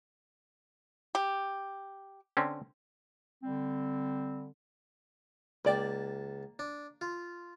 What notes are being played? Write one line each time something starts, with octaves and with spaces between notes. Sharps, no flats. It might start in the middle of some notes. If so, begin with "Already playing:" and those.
G4
D3 C4 C#4
D3 G3 C4
C#2 A#3 D5 G5 A5
D4
F4